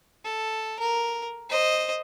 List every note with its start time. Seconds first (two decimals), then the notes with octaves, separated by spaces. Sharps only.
0.24 A4
0.79 A#4
1.49 C5 D#5